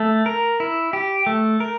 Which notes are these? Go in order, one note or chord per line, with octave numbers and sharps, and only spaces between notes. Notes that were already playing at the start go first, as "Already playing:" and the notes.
Already playing: A3
A#4
E4
G4
A3
A#4